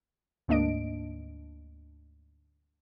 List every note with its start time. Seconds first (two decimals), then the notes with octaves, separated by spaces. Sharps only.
0.48 D2 G#2 A#3 D4 D#5 D7